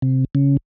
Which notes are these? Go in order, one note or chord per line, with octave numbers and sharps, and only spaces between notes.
C3
C#3